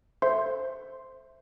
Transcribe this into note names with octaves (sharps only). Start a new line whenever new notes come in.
A4 C5 E5 C6 G6